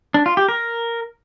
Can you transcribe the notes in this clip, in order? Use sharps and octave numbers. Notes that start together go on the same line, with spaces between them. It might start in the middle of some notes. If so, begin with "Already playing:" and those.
D4
F4
G4
A#4